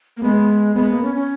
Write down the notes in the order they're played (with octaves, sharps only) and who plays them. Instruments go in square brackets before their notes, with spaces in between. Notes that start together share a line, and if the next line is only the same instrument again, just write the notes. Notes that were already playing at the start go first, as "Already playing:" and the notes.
[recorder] A#3
[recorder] G#3 [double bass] B3
[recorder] G#3 [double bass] B3
[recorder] A#3
C#4
C#4